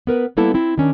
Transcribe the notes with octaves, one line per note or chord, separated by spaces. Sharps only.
B3 A#4 B4
G3 A#3 B3 E4 A4 A5
C4 E4
D#3 C#4 D4